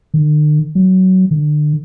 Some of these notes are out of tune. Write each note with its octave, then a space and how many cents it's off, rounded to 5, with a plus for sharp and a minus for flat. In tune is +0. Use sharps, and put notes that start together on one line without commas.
D3 +45
F#3 +15
D3 +30